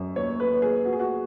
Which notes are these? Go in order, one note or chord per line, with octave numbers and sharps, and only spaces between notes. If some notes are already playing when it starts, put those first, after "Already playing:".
Already playing: F#2
D#2 C#5
B4
D#2
G#4
B3 F#4
G#4
F#4